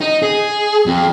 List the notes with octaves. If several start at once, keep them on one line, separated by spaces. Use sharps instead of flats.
D#4
G#4
F2